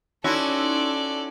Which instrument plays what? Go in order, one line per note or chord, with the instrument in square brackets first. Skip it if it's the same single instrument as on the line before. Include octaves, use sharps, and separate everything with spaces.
[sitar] C#4 E4 F#4 [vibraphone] D#4 C6 E6 [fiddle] A4 D5